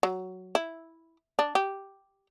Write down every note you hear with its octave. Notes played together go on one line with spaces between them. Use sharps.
F#3
E4
D4
G4